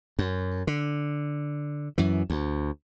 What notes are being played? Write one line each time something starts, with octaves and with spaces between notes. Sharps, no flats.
F#2
D3
F#2 E3
D2